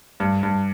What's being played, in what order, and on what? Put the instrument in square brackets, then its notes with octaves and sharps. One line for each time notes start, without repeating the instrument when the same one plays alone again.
[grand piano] G2
G2